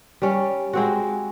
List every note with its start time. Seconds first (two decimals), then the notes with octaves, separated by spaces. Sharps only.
0.22 G3 C#4
0.73 G#3 C4 F#4